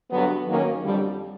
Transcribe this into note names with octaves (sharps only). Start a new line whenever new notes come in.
G2 D3 F#3 B3
G#2 D#3 F#3 A#3 C#4
F2 D3 G3